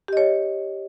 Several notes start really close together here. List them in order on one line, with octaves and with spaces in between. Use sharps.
G4 D#5 C#5